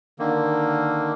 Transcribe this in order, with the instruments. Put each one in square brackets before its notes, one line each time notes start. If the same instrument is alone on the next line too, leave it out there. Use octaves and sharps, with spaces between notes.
[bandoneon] D3 D#3 A#3